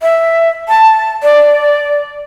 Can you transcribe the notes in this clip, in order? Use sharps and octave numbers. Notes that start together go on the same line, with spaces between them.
E5
A5
D5